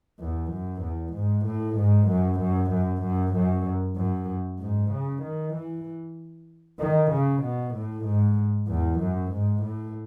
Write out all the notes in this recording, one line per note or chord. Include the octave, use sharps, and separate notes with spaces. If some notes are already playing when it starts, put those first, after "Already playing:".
E2
F#2
E2
G#2
A2
G#2
F#2
F#2
F#2
F#2
F#2
F#2
G#2
C#3
D#3
E3
D#3
C#3
B2
A2
G#2
E2
F#2
G#2
A2